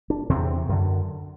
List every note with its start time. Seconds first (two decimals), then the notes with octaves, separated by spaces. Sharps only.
0.10 D4
0.29 E2 C3 C4
0.69 F#2 D3